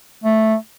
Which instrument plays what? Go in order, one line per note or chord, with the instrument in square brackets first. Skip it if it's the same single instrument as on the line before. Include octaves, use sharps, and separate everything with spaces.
[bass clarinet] A3